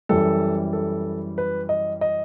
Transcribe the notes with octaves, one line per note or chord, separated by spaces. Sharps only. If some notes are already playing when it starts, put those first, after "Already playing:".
F#2 E3 G3 A4
A4
B4
D#5
D#5